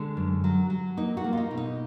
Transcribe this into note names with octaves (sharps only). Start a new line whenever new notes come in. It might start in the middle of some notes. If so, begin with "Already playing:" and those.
Already playing: D3 G#3 D4
F#2
F#3
F#3
A#3 D#4
F#4
A#3
F4
D#4
B2
D#4